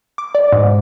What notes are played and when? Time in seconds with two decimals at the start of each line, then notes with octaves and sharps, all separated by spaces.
0.18 D6
0.35 D5
0.52 G#2